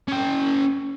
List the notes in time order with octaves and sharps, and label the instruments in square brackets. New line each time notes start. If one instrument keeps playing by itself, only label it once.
[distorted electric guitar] C#4 G5